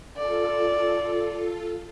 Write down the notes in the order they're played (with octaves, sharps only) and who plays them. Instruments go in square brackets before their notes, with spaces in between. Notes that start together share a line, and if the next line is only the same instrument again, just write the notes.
[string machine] F4 A4 [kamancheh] D5